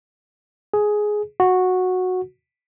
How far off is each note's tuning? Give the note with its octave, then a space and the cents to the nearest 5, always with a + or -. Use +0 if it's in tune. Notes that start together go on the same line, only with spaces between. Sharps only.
G#4 +10
F#4 -10